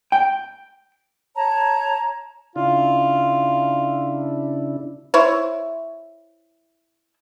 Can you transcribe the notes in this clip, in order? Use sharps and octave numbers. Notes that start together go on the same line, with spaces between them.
G5
C#5 A5 A#5
C#3 D4 E4 F4
E4 C5 C#5